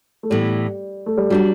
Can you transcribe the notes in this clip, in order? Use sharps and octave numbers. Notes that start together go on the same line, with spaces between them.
A3
A2 E3 G3 B3
A3
G3
F#3 G3 D4 F#4